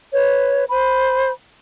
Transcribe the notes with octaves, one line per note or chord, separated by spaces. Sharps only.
B4 C#5
C5 B5